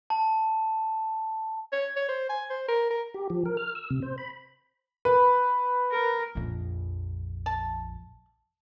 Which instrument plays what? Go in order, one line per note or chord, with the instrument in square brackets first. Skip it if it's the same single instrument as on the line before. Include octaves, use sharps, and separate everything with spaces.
[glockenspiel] A5
[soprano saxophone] C#5
C#5
C5
G#5
C5
A#4
A#4
[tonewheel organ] G4
F3
A#4
F6
E6
C3
C5
B5
[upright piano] B4 [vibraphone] B5
[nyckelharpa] A#4
[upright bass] A#1 F2
[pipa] A5